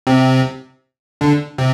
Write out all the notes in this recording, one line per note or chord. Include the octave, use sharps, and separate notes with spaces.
C3 C4
D3 D4
C3 C4